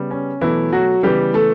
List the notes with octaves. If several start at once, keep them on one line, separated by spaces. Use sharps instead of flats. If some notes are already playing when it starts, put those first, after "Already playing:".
Already playing: C#3 G3 B3
C#4
B2 E3 F#3 A3 E4
F#3 F#4
C#3 E3 G3 B3 G4
A3 A4